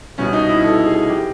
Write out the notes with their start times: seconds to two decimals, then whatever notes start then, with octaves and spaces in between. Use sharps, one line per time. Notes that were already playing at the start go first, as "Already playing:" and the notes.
0.18 C2 B2 C#4
0.33 D#4
0.48 E4
0.63 C2 B2 A4
0.86 G#4
1.09 C3 F3 G4